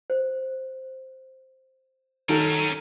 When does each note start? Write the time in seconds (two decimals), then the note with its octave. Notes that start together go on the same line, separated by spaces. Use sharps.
0.10 C5
2.29 D#3 C#4 A4 A#4